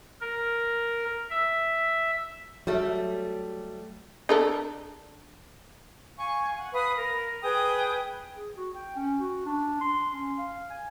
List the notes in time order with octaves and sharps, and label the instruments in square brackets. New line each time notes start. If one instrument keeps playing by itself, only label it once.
[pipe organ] A#4
E5
[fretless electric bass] F#3 [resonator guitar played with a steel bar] G3 A3
[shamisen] D4 A4 A#4
[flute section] F5 G#5 C#6
F#5
B4 F5 B5 D#6
A#4
G#4 B4 G5 D#6
[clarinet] G#4
F#4
G5
C#4
F#4
D4
C6
C#4
F5
G#5